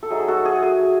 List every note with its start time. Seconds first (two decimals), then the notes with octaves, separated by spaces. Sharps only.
0.03 A4
0.10 F#3 A3 D#4 G#4
0.28 F#4 A4
0.45 G#4
0.63 G#4